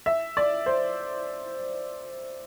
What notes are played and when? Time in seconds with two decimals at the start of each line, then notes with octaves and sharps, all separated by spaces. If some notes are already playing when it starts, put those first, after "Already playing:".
0.06 E5
0.37 D5
0.66 C5